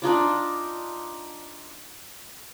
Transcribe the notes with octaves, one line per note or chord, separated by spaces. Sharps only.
D4 D#4 F4 D5